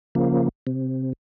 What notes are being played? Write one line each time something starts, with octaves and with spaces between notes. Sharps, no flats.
C#3 F3 A#3
C3